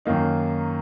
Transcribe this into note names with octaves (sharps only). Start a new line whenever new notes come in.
F#2 D#3 A#3 D#4